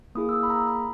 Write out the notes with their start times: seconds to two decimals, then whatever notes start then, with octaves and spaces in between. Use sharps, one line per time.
0.15 A#3 E4 G#4 D#6
0.29 E6
0.33 D#6
0.43 B5
0.50 A#5
0.68 B5